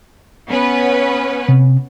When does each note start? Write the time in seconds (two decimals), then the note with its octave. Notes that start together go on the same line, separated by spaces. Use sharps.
0.49 B3 C#4 B4
1.49 C3